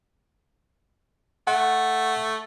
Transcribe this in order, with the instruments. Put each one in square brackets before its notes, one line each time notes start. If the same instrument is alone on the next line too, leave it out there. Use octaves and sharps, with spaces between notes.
[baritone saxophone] A3 [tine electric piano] F#5